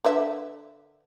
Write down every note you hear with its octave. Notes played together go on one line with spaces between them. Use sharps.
D3 B4 E5